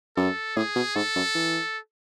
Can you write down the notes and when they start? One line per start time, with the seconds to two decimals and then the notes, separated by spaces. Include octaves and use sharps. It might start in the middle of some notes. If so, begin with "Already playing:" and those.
0.17 F#2 A4
0.56 A2 G#4
0.76 B2
0.96 G#2 A4
1.16 F#2
1.35 E3